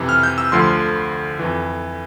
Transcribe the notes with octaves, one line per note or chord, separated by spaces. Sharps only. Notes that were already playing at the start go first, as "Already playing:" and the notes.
Already playing: F2 C3 E3
F6
G6
E6
D2 D3 F3 C6
F2 E3